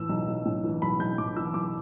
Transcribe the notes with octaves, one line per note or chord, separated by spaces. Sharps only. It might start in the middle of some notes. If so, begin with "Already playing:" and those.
Already playing: A2 E3 E6
B1
B1
A2
E3
B1 B5
B1 G6
A2 D6
E3 E6
B1 D6